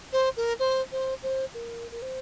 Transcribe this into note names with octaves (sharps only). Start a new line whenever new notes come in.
C5
A#4
C5
C5
C5
A#4
A#4
C5